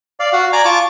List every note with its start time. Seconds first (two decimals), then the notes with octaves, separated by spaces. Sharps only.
0.20 D5 F5
0.33 F#4 F5 F#5
0.53 D5 G#5 A#5 D6
0.65 F4 A5 C#6 D6